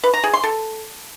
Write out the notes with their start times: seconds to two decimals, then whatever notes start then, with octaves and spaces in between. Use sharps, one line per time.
0.04 B4
0.14 A#5
0.24 G#4
0.34 C6
0.44 A4